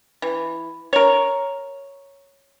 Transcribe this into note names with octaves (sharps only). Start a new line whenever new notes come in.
E3
A#4 C#5